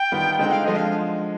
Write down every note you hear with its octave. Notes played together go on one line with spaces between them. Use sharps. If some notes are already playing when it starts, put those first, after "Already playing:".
Already playing: G5
D#3 G3 B3 F4
D3 G#3 C4 D#4 G5
F5
D3 F3 G#3 D#5
F5